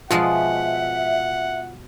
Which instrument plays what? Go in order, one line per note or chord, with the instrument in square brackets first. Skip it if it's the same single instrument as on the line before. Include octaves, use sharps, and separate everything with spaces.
[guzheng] B2 F3 G#3 [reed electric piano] F4 [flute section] E5 [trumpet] F#5